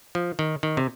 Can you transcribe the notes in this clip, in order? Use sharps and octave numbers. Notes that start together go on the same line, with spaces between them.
F3
D#3
D#3
C3